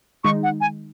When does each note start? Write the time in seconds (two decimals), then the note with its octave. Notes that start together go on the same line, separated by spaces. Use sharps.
0.24 D#3 G#3 D#4 C#6
0.43 F#5
0.61 G#5